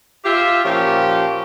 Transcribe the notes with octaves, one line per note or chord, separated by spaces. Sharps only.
F4 G4 E5
A#2 F3 C#4 F4 G4